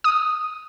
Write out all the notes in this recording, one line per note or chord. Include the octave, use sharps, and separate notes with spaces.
D#6